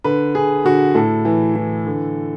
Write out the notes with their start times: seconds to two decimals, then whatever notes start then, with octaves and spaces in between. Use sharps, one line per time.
0.04 D3 B4
0.35 D3 G#4
0.65 D3 F#4
0.95 A2 A4
1.25 E3
1.56 E3
1.87 D3